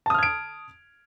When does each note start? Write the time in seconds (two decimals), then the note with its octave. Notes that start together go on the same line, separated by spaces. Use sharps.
0.06 A5
0.10 D#6
0.14 F6
0.19 G#6
0.23 D7